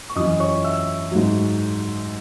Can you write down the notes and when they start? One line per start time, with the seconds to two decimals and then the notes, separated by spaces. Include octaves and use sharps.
0.10 C#6
0.15 F#2 E3 D#5 D#6
0.40 C#5 C#6
0.64 E5 E6
1.11 G#2 F#3